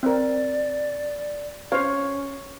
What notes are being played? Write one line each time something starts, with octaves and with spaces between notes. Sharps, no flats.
C4 A#4 D5
C#4 C5 C#5 F5